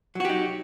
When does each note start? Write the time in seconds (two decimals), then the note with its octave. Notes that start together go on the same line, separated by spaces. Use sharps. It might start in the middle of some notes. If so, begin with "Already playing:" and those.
0.15 F#3
0.20 F#4
0.25 G4
0.29 D#4